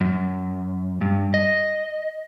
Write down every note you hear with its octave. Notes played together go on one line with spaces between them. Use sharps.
F#2
G2
D#5